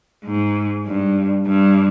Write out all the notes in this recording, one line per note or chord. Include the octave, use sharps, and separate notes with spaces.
G#2
G2
G2